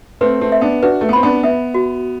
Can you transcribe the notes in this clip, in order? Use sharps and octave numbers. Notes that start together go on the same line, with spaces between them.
A3 C4 B4
A3 C4
E5
B3 D4
D4 F#4 B4
A3
B3
C4 B5
B3 D4
B3 E5
F#4